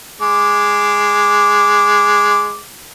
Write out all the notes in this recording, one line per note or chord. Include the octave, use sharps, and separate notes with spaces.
G#3 D6